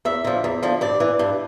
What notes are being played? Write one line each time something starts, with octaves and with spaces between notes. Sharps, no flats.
E2 E5
D3 F3
E2
D3 F3
G2 D5
E3
G2